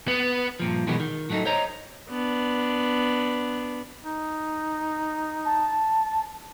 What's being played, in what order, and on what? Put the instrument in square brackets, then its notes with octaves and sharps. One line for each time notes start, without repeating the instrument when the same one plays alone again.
[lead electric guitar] B3
[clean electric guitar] G2 A#2 F3
B2 D#3 E3 F#3 G#3 B3
D#3
A2 F#3 A3 D4 D#4
C5 C#5 D#5 A#5
[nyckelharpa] B3 D4
[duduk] D#4
[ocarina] A5